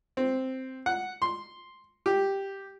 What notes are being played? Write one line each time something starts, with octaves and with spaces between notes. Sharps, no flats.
C4
F#5
C6
G4